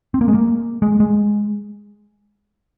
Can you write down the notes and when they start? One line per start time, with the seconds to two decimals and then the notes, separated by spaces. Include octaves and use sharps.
0.14 C4
0.21 A#3
0.28 G#3
0.35 A#3
0.82 G#3
1.00 G#3